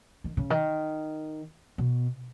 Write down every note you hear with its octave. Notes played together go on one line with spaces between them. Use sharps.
D#3
C#3
D#3
B2